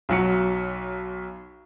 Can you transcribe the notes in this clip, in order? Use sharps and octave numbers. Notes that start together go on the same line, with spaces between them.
B1 F#3 C#7